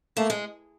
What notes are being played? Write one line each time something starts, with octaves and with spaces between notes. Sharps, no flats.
A3 A#3
G#3